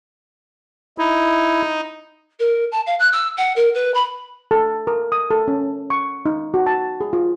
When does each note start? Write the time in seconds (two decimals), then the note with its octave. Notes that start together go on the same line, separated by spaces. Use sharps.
0.98 D#4 E4
2.39 A#4
2.71 A5
2.86 F5
2.99 F#6
3.12 E6
3.37 F#5
3.56 A#4
3.74 B4
3.94 B5
4.51 A4
4.87 A#4
5.12 D#6
5.31 A4
5.48 C#4
5.90 C#6
6.26 D#4
6.54 F#4
6.66 A5
7.01 G#4
7.13 F4